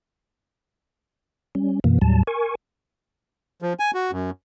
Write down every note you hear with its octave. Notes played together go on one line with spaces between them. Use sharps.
G3 C#4
F#2 B2 E3 A#3
D#2 A2 F#3 G3 A5
A#4 G#5 C#6
F3
G#5
F#4
F#2